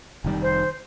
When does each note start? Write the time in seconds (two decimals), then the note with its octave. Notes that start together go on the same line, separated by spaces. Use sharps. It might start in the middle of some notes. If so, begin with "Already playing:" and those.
0.24 F1 D#3 G3
0.43 C5